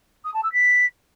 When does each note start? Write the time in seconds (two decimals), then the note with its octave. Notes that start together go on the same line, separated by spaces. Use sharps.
0.24 D#6
0.34 A5
0.43 E6
0.53 B6